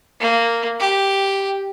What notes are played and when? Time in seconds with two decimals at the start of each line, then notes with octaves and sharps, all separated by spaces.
0.21 A#3
0.80 G4